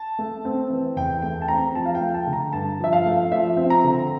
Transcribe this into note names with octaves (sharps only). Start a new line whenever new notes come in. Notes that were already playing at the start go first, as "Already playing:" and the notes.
Already playing: A5
A3
C4
E3
E2 G5
A3 G5
A5
C4 A#5
F3 A5
F5
G5
A3
A5
D3
A#5
G2 A5
F3 E5
F5
A3
F3 E5
C4
A#5
D3